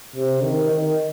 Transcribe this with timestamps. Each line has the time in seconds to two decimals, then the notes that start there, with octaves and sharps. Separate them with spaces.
0.15 C3
0.43 D#3
0.72 D#3